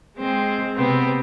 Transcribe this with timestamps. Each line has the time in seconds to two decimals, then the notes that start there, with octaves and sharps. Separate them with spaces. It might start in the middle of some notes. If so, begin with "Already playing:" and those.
0.17 G#3 C4
0.76 C3 B3 C4